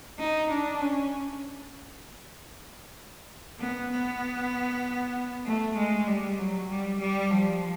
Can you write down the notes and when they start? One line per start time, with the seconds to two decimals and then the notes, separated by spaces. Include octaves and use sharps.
0.19 D#4
0.51 D4
0.81 C#4
3.59 B3
3.91 B3
5.45 A3
5.77 G#3
6.07 G3
6.38 F#3
6.70 G3
7.01 G3
7.31 F3